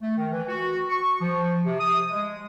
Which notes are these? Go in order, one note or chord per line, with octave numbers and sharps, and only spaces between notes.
A3
D#3
E3
F#4
C#6
F3
C3
D#6
G#3